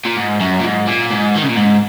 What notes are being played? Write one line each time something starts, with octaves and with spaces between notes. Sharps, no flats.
A#2
G#2
F#2
A#2
G#2
A#2
G#2
D#3
C#3
A#2
G#2